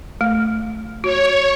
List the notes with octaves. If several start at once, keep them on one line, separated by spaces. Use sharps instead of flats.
A3
F#4 C#5